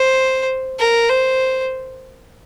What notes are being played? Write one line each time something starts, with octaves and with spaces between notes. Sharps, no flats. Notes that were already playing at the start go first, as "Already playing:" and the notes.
Already playing: C5
A#4
C5